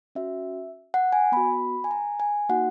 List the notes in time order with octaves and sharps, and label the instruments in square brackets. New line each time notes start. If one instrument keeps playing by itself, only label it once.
[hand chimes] C#4 F#4 E5
F#5
G#5
B3 F#4 B5
G#5
A#5
G#5
A#3 D#4 F#4 F#5